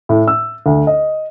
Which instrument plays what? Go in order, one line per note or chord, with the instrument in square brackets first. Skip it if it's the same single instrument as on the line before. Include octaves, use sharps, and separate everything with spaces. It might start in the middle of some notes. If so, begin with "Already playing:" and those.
[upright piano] A2
E6
D2
D#5